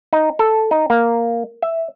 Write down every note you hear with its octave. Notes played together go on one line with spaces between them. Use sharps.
D#4
A4
D#4
A#3
E5